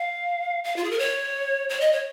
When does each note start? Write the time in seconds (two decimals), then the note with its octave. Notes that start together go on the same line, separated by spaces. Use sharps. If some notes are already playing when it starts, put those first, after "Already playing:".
Already playing: F5
0.64 F5
0.76 F4
0.84 G#4
0.91 A#4
0.99 C#5
1.69 C#5
1.80 D#5
1.92 C#5